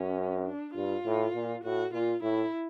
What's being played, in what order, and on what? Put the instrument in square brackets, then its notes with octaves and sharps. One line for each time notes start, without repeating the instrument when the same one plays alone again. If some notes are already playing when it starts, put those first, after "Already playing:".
Already playing: [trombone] F#2 [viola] C#4
[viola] D4
[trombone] G2 [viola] F4
[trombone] A2
A#2
[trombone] A2 [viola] F#4
[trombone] A#2 [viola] F4
[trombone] A2 [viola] E4